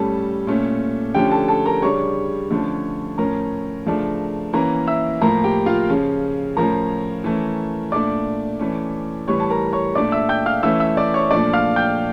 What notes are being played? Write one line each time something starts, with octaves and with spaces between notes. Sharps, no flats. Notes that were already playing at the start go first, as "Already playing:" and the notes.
Already playing: A2 G3 C#4 A4 A5
A#2 A3 C#4
D3 F3 A3 C#4 G4 G5
A4 A5
A4 A5
A#4 A#5
C#3 G3 D4 C#5 C#6
D3 F3 A3 C#4
A2 F3 C#4 A#4 A#5
C#3 F3 A3 D4
E3 A#3 C#4 A#4 A#5
E5 E6
A2 F3 A#3 A#4 A#5
G4 G5
F4 F5
C#3 F3 C#4
A2 F3 C#4 A#4 A#5
E3 A3 C#4
A#2 A3 D4 D5 D6
E3 A3 C#4
A2 E3 G3 C#5 C#6
A5
A#4 A#5
C#5 C#6
A#2 A3 D4 D5 D6
E5 E6
G5 G6
F5 F6
E3 A3 C#4 E5 E6
E5 E6
D5 D6
C#5 C#6
A#2 F3 A3 D4 D5 D6
F5 F6
G5 G6